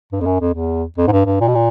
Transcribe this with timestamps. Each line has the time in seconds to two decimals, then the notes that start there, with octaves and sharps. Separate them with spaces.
0.12 G2
0.21 F2
0.26 F#2
0.40 F2
0.54 E2
0.98 F2
1.07 G#2
1.12 G2
1.26 G2
1.41 A#2
1.48 B2
1.55 A#2